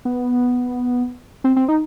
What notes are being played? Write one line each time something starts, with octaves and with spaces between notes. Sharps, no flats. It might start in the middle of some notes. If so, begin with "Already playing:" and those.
B3
C4
C4
D#4